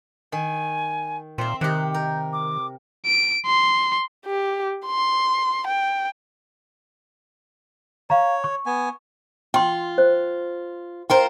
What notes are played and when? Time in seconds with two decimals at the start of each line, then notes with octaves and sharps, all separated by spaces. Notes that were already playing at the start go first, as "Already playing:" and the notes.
0.32 D#3 G#5
1.38 A#2 C4 E5 C6
1.61 C3 D#3 G4 F#6
1.94 A#4 G6
2.33 D6
3.06 D7
3.46 C6
4.25 G4
4.86 C6
5.67 G5
8.10 C#5 F5 A#5
8.44 C#6
8.66 B3 G#5
9.54 F4 G5 C6
9.98 C5
11.10 F4 A#4 C5 G5